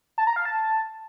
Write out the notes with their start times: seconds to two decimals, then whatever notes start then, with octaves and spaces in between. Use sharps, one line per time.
0.18 A5
0.27 A#5
0.36 F5
0.45 A5